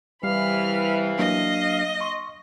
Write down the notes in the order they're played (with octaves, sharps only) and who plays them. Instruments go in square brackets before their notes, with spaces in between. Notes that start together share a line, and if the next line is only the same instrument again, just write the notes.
[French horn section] C3 E3 [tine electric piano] G3 G4 [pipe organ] F5 [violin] B5 F6
[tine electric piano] F#3 A#3 D4 [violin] D#5
[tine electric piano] C6 C#6